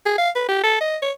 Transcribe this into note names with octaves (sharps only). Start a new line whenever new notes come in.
G#4
F5
B4
G4
A4
D#5
C#5